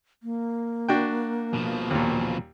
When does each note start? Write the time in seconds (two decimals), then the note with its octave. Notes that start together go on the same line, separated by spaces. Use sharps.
0.23 A#3
0.89 D4 F#4 G5
1.54 B2 F3
1.91 D#2 A#2